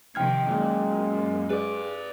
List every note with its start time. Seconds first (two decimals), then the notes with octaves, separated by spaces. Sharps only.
0.15 C3 D#3 F3 G5 F6 G#6
0.48 F#2 A#2 G#3
1.50 G#4 B4 D5